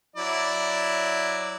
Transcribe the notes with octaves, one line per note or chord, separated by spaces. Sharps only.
F#3 E4 D5